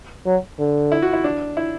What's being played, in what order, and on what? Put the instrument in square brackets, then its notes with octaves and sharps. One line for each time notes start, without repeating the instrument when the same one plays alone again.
[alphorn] F#3
D3
[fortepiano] E4
F#4
E4
D4
E4